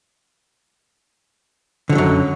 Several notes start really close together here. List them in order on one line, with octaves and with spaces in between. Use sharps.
D3 F3 F#3 F#2